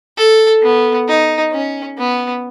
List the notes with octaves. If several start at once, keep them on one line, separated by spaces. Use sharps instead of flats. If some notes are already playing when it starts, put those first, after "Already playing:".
A4
B3
D#4
C#4
B3